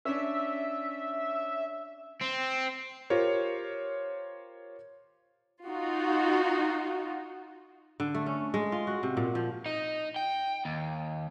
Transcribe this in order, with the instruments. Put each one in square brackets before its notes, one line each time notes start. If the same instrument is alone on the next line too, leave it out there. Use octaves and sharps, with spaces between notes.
[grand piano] C#4 D4 [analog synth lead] E5
[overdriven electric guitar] C4
[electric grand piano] F4 G4 A#4 C5 C#5
[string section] D#4 F4 F#4
[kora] D3
A3
C#4
G#3
F4
F#4
C3
A#2
F3
[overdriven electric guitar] D#4
G5
D#2